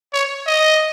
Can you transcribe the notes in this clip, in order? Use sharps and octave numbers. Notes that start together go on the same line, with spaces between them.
C#5
D#5